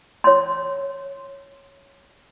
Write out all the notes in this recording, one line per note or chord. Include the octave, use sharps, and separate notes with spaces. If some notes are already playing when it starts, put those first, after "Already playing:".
C#5 C6